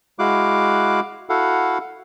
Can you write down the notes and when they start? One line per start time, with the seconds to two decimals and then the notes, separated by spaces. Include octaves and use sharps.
0.19 G#3 E4 F#4 F5 D6 F#6
1.29 E4 F#4 A4 F5 F#5